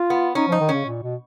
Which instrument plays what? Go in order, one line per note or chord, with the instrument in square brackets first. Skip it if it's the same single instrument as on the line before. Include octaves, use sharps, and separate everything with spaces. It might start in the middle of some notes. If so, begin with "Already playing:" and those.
Already playing: [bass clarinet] F4
[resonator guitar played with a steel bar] B3
[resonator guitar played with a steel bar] C#4 [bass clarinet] D#4
[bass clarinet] F3 [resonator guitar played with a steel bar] D#4
[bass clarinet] D#3
[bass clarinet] C#3 [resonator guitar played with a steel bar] C#4
[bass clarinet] A#2
B2